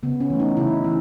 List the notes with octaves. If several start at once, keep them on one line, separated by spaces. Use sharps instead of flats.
C#3 B3
C#4
E3 A3
D#4
C#3 E4
E3